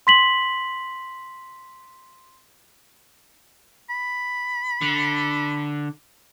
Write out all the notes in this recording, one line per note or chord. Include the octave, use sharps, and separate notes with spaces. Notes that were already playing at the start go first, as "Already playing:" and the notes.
C6 B6 F#7
B5
D3